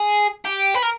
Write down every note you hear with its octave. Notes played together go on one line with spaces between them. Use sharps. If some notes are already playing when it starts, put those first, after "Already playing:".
Already playing: G#4
G4
B4
A#4